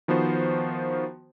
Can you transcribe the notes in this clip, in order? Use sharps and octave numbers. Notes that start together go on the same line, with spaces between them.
D#3 F3 B3 F#4 C5